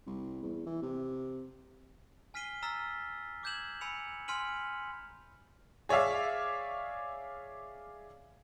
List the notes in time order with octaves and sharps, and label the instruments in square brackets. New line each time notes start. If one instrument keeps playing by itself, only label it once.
[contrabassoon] C2
E2
E3
C3
[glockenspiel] G#5 F6 B6 C7 D#7 G7
A#5 E6 F6 A6 B6
D6 E6 G6 G#6 E7 F#7
G#5 B5 E6 C#7 F7
G#5 C6 F6 B6 D#7 F#7
[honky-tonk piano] G#4 C#5 D5 E5 F5